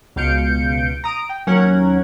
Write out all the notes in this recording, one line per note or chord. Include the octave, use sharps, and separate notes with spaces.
C#2 B2 F5 G6 C#7 D7
A#5 D#6 D7
G5
D#2 F#3 C#4 A#4 F#5 G#6